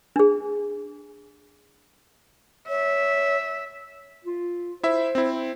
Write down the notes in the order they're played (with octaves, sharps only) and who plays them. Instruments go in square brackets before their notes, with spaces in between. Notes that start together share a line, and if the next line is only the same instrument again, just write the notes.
[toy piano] D4 G#4
[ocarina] C#5 [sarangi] E5
[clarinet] F4
[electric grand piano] E4 E5 [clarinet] C5
[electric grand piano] C4 E4